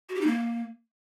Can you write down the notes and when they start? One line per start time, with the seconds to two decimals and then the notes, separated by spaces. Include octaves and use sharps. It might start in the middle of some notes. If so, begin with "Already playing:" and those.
0.09 F#4
0.15 G4
0.21 D#4
0.27 A#3